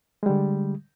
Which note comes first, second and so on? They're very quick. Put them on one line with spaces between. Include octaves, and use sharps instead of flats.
G#3 G3 D3